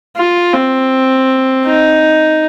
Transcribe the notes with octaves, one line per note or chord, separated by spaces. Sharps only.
F4
C4
D#4